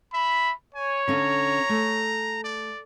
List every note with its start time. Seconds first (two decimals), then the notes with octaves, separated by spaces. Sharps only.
0.14 E5 B5
0.75 C#5 G#5
1.08 D3 C#4 F5 A#5
1.69 A3
2.44 D5